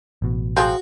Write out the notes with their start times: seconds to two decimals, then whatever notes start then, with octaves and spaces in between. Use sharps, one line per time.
0.22 A1 B2
0.57 F3 G#3 C4 F#4